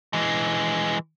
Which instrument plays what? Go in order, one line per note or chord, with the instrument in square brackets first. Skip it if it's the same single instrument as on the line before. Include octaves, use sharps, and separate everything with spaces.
[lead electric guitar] E3 G#3